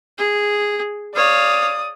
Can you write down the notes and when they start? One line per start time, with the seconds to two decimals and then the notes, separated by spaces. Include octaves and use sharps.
0.18 G#4
1.15 C#5 D5 F5 D#6